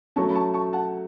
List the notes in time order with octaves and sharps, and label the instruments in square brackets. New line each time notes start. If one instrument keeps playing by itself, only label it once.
[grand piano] F#3 A3 C#4 [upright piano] A5 C#6
[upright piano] B5
A5 C#6
A5 C#6
F#5 A5